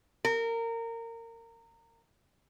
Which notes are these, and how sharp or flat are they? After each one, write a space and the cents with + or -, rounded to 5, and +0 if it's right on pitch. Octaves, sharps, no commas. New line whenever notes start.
A#4 -25